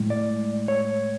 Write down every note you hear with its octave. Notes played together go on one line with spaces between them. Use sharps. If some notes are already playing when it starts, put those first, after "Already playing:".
Already playing: A2 G#3
D5
C#5